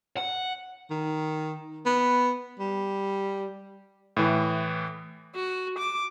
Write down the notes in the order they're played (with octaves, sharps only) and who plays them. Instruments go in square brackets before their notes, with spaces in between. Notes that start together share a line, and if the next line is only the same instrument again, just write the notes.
[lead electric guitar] F#5
[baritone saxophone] D#3
B3
G3
[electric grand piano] A2 E3
[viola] F#4
D6